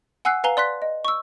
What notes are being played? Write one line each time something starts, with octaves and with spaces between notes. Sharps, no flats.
F#5 G#5 E6 F#6 C7
B4 F5 G#5 A#5 C7 G7
D5 C6 F#6 B6
D#5
C#6 E6